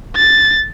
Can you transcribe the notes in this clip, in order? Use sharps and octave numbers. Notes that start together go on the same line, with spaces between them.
A6